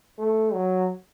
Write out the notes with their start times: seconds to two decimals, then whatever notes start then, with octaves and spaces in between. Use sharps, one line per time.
0.18 A3
0.53 F#3